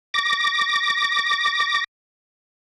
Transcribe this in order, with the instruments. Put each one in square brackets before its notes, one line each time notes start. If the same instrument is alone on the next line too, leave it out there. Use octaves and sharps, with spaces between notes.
[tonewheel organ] D6 A#6